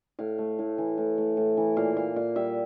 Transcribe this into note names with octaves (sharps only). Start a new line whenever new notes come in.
A2 F5
A3
A2
E3
A2
A3
A2
E3
A#2 F5
A#3 F5
A#2 F5
G3 E5